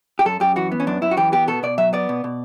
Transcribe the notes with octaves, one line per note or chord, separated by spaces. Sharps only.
G4
F#2 A4
F#2 G4
E3 F#4
B3
C#4
F#2 D4
F#2 E4
F#4
E3 G4
B3 G4
B2 A4
B2 D5
F#3 E5
B3 D5
B2
B2